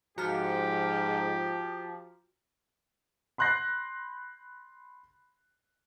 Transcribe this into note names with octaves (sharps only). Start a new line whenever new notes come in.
G#2 F3 F#4 G4 A#5 F6
B5 C6 F#6 G6 A#6 C7